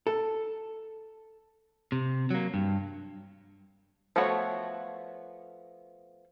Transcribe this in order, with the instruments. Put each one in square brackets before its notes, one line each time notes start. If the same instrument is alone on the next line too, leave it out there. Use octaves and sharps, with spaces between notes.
[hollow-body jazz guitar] A4
[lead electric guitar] C3
F#3 A#3
G2
[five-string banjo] F3 A3 B3 F#4 C#5